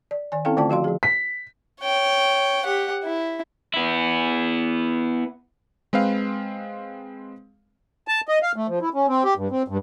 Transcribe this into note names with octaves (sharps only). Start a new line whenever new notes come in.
D5
D#3 D5 G#5
C4 C#4 E4 A4 F5 G5
D3 A3 F4 D5 G5 A5
F3 F#4 F5 C6
F3 G#4
B6
C#5 G5
G4 F#5
E4
B3 E4
G#3 C4 B4 F5
A5
D#5
F5
A3
F3
E4
C#4
C4
G4
G2
C4
G2